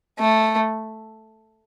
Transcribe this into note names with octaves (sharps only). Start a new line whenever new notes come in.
A3